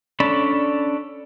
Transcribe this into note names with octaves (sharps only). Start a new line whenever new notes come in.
C#4 D4 A4 D5 B5